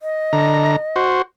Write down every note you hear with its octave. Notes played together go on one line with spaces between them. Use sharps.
D#5
D3 A#5
F#4 C5